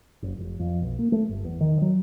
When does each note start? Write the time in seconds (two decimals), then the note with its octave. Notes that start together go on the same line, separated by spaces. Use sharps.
0.22 F#1
0.39 F1
0.59 F2
0.82 B1
0.99 A#3
1.12 A3
1.29 G1
1.45 E2
1.61 D#3
1.82 F#3